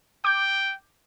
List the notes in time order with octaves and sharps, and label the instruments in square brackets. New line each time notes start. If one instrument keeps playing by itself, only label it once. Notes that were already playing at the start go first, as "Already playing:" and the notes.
[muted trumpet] G5 [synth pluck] D6 G6